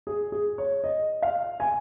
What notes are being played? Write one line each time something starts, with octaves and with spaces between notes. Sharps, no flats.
G#4
G#4
C#5
D#5
F5
G#5